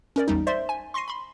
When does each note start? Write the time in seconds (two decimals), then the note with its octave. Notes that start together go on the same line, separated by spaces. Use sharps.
0.16 C#4 A#4 D5
0.28 A1 E2 G3 D#4
0.47 C5 D5 E5 C6
0.69 G#5
0.94 C6 C#6 A#6 C7 D#7
1.08 B5 C6